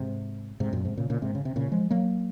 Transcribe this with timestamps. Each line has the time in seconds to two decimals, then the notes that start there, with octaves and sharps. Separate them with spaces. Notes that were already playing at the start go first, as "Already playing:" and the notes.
Already playing: G#2 C3
0.60 G#2 C3
0.73 F#2 A#2
0.85 G#2 C3
0.97 A#2 C#3
1.10 A#2 C#3
1.22 G#2 C3
1.35 C#3
1.45 C3
1.56 A#2 C#3
1.72 F3 G#3
1.91 F#3 A#3